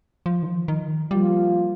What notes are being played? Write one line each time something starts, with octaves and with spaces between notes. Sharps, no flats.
F3
D#3
F3
D#3
F3 G3 A#3 F4